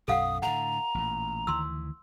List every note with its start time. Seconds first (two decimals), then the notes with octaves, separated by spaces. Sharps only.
0.08 B1 F#2 A4 F5 F#5 D#6
0.42 A2 D3 F#5 A#5
0.95 A1 A#2
1.47 D2 D#3 E3 C6 E6